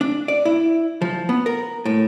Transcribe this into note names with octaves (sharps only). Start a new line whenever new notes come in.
D4
D5
E4
F3
B3
A#4
A2